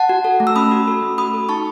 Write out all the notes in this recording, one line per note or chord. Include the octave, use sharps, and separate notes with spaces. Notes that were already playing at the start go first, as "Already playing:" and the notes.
Already playing: F#5 A5
F#4
A4
A3
E6
C#4 B5 D#6
F#4
A4
A3
F#4 B5 D#6
A4
D#4 A5 C#6